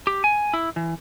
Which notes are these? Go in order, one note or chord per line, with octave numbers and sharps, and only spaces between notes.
G4
G#5
E4
E3